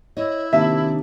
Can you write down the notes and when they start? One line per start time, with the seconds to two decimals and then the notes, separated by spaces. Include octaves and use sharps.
0.17 E4 C#5 D#5
0.53 C3 D#3 A#3 D4 E5